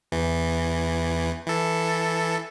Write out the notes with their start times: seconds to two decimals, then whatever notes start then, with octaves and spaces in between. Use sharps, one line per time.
0.12 E2 E3
1.47 E3 A4